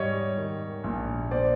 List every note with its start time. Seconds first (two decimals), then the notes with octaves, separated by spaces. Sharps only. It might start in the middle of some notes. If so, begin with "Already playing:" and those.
Already playing: G#2 G3 C#5 D#5
0.37 D#3
0.84 A#1
1.31 A#2 C5 D5